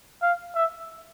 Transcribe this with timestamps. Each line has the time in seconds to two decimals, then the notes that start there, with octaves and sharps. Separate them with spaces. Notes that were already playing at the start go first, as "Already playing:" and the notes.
0.22 F5
0.55 E5